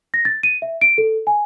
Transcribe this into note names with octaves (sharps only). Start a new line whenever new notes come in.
A#6
A6
D#7
E5
D7
A4
G#5